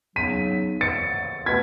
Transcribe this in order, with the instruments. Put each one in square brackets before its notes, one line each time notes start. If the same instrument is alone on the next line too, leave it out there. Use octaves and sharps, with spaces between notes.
[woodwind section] C#3 F#3 B3 D#4 [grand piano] B6 D#7
[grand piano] A6 C#7
[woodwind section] B2 A3 [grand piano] G#6 B6